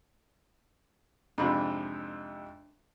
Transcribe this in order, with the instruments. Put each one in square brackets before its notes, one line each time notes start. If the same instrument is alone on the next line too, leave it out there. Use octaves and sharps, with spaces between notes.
[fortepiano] F2 G#2 C3 [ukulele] D4 C5 B5